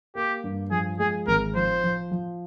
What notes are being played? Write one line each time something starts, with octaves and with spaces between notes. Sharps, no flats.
A#3 G4
G2
F3 G#4
G#3 G#4
G#1 A#4
F3 C5
F3
F3